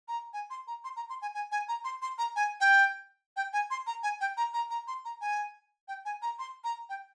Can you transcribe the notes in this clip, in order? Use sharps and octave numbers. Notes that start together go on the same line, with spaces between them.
A#5
G#5
C6
A#5
C6
A#5
C6
G#5
G#5
G#5
A#5
C6
C6
A#5
G#5
G5
G5
G#5
C6
A#5
G#5
G5
A#5
A#5
A#5
C6
A#5
G#5
G5
G#5
A#5
C6
A#5
G5